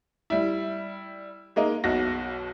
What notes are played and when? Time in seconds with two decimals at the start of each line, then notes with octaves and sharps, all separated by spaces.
0.30 G3 E4
1.56 G#3 A#3 D#4
1.84 B1 B2 F#4 A#6